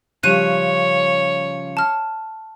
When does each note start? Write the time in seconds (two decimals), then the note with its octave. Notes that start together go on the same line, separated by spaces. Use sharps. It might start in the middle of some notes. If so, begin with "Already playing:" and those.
0.23 C#3 F3 G3 C#5 F#6 D#7
1.77 A5 F6